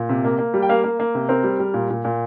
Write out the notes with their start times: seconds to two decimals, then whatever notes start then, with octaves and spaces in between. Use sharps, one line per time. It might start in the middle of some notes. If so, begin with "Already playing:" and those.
Already playing: A#2
0.09 C3
0.24 A#3
0.39 A#3
0.54 G3
0.62 G5
0.69 A#3 F5
0.84 A#3
1.00 A#3
1.15 C3
1.29 C4 A#4
1.44 G3
1.59 G3
1.74 A#2
1.90 A#2
2.05 A#2